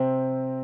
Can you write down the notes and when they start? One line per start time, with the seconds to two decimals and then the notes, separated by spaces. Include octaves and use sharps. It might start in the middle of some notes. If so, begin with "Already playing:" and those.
Already playing: C3 C4